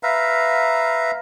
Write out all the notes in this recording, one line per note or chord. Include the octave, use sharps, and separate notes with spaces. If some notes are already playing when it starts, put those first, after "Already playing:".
B4 E5 F5 A#5